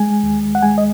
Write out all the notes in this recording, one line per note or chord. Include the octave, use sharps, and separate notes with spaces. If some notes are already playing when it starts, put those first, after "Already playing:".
Already playing: G#3 G#5
D#2
F#5
G#3 G#5
D#5